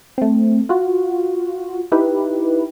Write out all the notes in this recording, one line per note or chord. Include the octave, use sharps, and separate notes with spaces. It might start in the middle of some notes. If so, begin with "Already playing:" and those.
A3 C4
F4 F#4
D#4 E4 G4 B4